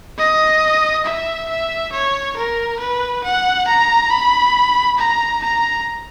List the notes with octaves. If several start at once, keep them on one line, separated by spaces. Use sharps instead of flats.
D#5
E5
E5
C#5
A#4
B4
F#5
A#5
B5
A#5
A#5